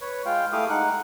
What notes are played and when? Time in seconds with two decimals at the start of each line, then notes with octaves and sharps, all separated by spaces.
0.01 B4 C#5
0.26 G#3 F4 F5 G5
0.52 A3 E4 G4 F5 D6 D#6
0.70 G#3 D#4 F#5 F#6